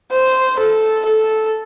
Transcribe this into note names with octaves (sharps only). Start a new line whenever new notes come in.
C5
A4
A4